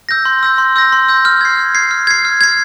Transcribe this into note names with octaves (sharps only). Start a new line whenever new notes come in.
E6 G6 A#6
C6
E6 G6 A#6
C6
E6 G6 A#6
C6
E6 G6 A#6
F6
G#6 C7
F6
G#6 C7
F6
G#6 C7
F6
G#6 C7